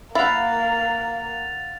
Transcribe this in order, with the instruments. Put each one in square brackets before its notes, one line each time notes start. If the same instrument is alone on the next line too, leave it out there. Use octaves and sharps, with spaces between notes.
[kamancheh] A#3 [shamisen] E4 [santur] F5 F#5 [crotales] A6 F7